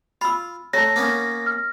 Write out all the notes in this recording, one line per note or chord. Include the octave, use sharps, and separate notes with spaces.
F4 B5 E6
A3 C#5 A#5 A#6
A#3 B3 C#4
F6